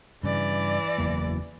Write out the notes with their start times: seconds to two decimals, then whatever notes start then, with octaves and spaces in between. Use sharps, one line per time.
0.23 G2 C#3 E3 D5
0.98 F#1 E2 A#3